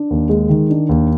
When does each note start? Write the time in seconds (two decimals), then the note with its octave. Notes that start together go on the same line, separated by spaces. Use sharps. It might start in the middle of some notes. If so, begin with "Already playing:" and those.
Already playing: D4
0.11 D#2
0.29 G#3
0.49 D#3
0.70 D4
0.89 D#2